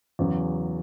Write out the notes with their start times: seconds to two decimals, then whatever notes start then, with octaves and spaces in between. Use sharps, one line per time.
0.19 E2 C#3 F#3